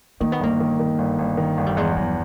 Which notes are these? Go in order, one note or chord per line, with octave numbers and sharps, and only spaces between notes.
D#3 A#3
B3
G1 A#3
D#3
D#3
G1
G1
D#3
G1
G3
E2 G#3
E2 F#3